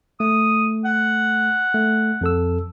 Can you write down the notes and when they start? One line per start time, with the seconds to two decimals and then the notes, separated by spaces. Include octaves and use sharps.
0.20 A3 D#6
0.85 F#5
1.74 A3
2.21 F2 A4 E6